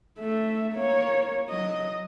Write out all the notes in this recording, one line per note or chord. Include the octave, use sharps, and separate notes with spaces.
A3 E5
A#3 C#5
F#3 D#5